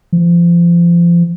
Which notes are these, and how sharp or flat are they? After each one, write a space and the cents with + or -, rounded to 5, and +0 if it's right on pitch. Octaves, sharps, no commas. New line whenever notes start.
F3 -30